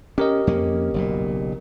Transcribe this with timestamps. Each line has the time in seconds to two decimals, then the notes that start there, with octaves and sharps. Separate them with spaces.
0.18 C#4 G4 A#4 D#5
0.47 F2 A#3 C#4
0.94 F#1 B1 A#2